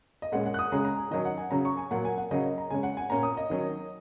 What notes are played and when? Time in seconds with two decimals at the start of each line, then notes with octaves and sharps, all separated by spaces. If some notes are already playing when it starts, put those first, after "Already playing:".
0.22 D#5
0.32 A#2 G#3 C#4 F#5
0.46 F#5
0.54 F#6
0.59 D#6
0.72 C#3 G#3 C#4 A#5
0.85 A#5
0.98 G#5
1.11 D#3 F#3 C#4 D#5
1.25 F#5
1.38 G#5
1.51 C#3 F#3 C#4 A#5
1.65 C#6
1.77 G#5
1.91 A#2 F#3 A#3 F#5
2.05 G#5
2.18 F#5
2.31 C#3 F#3 A#3 C#4 D#5
2.44 D#5
2.58 A#5
2.70 C#3 G#3 C#4 G#5
2.83 F#5
2.97 G#5
3.10 A#2 A#3 C#4 A#5
3.23 D#6
3.37 D#5
3.50 D#3 F#3 C#4